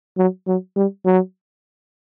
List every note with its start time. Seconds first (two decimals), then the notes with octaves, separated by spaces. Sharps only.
0.18 F#3
0.47 F#3
0.76 G3
1.05 F#3